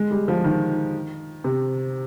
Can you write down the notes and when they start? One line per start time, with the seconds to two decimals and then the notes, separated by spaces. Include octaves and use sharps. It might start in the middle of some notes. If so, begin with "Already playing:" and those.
Already playing: G#3
0.11 G3
0.28 F3
0.44 D#3
1.44 C3